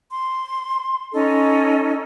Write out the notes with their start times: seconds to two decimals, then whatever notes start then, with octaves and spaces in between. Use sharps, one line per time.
0.09 C6
1.13 C#4 D#4 A4 D#5